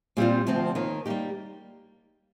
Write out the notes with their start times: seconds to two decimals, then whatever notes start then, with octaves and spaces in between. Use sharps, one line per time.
0.17 A#2 G3 C4 F4
0.47 D2 C3 F3 C4
0.75 D#2 D#3 A#3
1.06 G3 A#3 D#4 G4